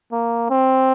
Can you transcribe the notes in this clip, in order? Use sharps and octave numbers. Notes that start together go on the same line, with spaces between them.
A#3
C4